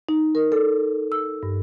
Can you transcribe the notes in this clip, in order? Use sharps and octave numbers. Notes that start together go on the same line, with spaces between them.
D#4
A#4
A4
E6
G2